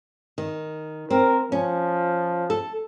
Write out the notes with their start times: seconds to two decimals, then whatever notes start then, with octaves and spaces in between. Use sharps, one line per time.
0.38 D#3
1.10 C4 A#4
1.52 F3 C#4
2.50 A4